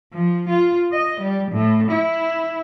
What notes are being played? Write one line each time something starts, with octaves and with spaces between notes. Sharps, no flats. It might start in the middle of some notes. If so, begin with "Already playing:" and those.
F3
F4
D#5
G3
A2
E4